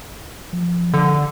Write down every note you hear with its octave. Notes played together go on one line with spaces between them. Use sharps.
F3
D3